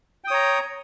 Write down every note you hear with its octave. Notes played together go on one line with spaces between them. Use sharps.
C#5 G5 A#5 D#6